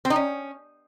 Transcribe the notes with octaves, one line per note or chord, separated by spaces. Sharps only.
C4
D#4
C#4